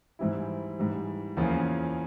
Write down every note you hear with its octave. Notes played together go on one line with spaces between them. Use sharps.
G#2 E3 G3 C4 E4
G#2 E3 G3
E2 C#3 F3 A#3 C#4